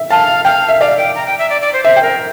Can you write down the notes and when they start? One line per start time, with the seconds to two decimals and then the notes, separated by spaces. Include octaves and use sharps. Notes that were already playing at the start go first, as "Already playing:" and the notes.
Already playing: E5
0.10 F5 A5
0.45 F5 G5
0.69 E5
0.80 D5 F5
0.98 G5
1.15 A#5
1.26 G5
1.39 E5
1.50 D5
1.61 D5
1.73 C5
1.84 C5 E5
1.96 G5
2.02 A#4